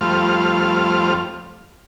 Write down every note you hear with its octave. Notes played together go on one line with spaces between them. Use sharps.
F2 G3 A3 F4 C5 F6